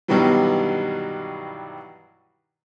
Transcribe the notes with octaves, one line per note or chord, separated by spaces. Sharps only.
G2 B2 D#3 E3 F#3 G3